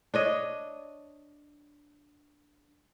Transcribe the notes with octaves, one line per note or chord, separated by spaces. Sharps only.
D4 C#5 D#5